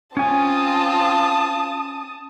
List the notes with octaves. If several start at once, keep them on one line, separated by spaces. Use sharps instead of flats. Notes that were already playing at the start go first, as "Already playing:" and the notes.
C4 C#4 F4 G#5 A5 D#6